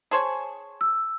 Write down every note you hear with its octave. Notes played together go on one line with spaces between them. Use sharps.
G#4 C5 C#5 A5
E6